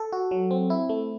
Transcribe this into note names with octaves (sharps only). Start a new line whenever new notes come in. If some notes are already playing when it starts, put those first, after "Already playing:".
Already playing: A4
F#4
F#3
C4
E4
A3